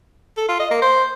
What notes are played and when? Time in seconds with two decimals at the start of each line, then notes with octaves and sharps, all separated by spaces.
0.37 A4
0.48 F4
0.60 D#5
0.71 A#3
0.82 C5